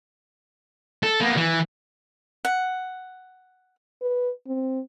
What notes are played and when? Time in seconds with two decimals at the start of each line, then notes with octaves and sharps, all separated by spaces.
1.03 A4
1.21 A#3 B3
1.37 E3
2.45 F#5
4.02 B4
4.47 C4